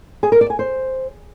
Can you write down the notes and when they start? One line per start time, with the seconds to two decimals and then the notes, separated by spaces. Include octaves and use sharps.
0.23 G#4
0.32 A#4
0.41 D5
0.50 G#5
0.59 C5